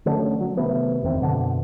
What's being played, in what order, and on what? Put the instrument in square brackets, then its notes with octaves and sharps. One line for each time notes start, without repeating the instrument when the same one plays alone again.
[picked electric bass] D3 F#3 A3 C#4
F#3
C3 D#3 A3 B3
F#1 E2 D#3 C4
F#2 B2 D3